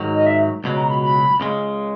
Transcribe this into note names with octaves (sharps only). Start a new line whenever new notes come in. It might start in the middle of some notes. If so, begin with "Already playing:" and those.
Already playing: G#2 D#3 F#3
D#5
E5
C#2 B2 F#3
A#5
B5
B5
C#2 C#3 G#3